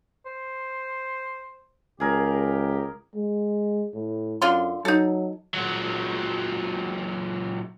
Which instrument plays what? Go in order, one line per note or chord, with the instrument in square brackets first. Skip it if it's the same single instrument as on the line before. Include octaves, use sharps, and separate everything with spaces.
[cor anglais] C5
[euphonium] C#2 [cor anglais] G4 [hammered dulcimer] G#4 A#4
[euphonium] G#3
A2
[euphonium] F#2 [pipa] D3 F4 C6
[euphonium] F#3 [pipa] D#4 A4
[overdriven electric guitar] A#2 F#3